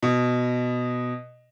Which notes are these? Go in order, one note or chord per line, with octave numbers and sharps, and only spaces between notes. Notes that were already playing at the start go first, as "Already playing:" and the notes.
B2